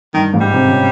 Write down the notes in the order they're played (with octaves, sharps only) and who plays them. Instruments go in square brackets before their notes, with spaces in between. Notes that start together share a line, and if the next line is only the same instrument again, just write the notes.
[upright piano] G2 [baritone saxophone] D#3
[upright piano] G#2
[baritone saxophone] G3
[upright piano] C3
C#3